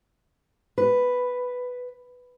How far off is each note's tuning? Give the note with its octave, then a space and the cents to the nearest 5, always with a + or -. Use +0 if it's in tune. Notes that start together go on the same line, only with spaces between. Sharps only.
B4 +5